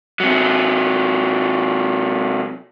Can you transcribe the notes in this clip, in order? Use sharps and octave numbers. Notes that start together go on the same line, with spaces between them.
C3 F#3